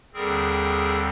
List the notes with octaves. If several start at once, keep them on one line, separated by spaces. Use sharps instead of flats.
D#2 D3 G3 C4 G#4 A#4